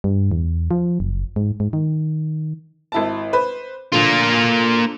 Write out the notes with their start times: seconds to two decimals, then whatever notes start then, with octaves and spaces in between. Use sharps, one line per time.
0.04 G2
0.31 E2
0.71 F3
1.00 F#1
1.36 G#2
1.60 G#2
1.73 D#3
2.92 G#1 E4 A5
3.33 B4 C5
3.92 D3 F3 A#3 F4